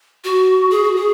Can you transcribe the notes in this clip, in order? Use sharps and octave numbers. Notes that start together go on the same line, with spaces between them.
F#4
G#4
F#4
G#4